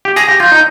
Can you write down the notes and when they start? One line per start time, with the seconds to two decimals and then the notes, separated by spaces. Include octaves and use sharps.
0.05 G4
0.16 G#4 A#6
0.29 G4
0.40 F4 G6
0.52 D#4